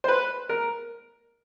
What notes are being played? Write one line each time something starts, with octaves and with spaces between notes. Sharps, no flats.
C5
B4
A#4